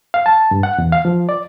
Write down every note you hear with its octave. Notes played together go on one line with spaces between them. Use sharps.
F5
A5
G2
F#5
E2
F5
F3
D5